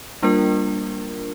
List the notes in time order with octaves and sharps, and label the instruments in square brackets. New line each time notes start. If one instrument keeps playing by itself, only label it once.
[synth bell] G3 A#3 D4 F4 A#4